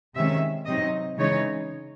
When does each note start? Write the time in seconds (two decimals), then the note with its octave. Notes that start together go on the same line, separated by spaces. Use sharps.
0.16 C3 D#3 G#3 C#4 E5
0.66 C3 F#3 C4 D#4 D#5
1.17 C#3 E3 G#3 D#4 C#5